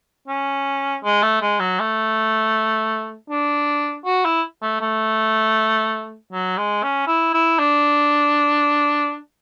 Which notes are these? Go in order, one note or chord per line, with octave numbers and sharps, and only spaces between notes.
C#4
G#3
A3
G#3
F#3
A3
D4
F#4
E4
A3
A3
F#3
G#3
C#4
E4
E4
D4